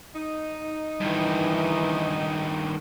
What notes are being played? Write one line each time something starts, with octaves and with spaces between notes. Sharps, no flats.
D#4
G2 D#3 E3